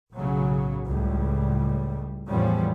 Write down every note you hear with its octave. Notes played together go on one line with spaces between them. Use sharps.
B1 A2 C#3 F#3
C#2 A2 G3
E2 A2 F3 G3 B3 C#4